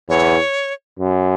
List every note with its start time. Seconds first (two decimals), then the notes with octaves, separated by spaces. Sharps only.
0.09 E2 C#5
0.99 F#2